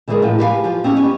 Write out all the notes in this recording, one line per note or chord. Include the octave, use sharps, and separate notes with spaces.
D3 E3 G3 G#3 G#4 A#4
A2 F3 B4
F#4 G4 B4 C5 F5 G#5
F3 F4
C4 C#4 D#4 G4 C#5
G3 B3 C#4